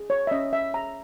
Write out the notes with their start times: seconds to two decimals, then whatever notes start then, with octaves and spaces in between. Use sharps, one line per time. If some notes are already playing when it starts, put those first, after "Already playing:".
Already playing: G#4
0.10 C#5
0.27 E5
0.31 C#4 D#5
0.53 E5
0.74 G#4 C#5 A#5